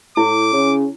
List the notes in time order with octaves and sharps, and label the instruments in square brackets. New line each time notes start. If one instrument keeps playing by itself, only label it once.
[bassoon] A2 [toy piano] E4 [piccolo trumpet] D6
[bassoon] C#3 [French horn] C#4